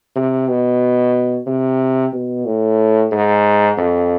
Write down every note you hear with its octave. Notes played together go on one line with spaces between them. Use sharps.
C3
B2
C3
B2
A2
G#2
F2